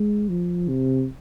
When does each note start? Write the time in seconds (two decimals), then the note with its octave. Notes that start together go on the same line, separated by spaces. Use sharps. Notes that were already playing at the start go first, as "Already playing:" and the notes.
Already playing: G#3
0.29 F3
0.68 C3